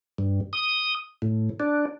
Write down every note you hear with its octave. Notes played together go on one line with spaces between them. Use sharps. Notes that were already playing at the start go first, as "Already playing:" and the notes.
G2
D#6
A2
D4